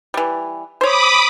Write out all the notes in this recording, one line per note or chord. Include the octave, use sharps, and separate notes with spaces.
E3 G3
C5 C#5 B5 D6 D#6